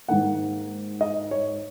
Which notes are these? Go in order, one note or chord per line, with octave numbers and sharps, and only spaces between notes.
G#2 D#3 A#3 F#5
D#5
C#5